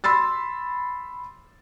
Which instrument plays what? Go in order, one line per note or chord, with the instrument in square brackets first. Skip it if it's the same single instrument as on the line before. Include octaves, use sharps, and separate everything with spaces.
[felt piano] B5 C6 E6 A6